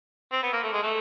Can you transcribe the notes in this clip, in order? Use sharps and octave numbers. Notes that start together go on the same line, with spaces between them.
C4
B3
A#3
A3
G#3
A3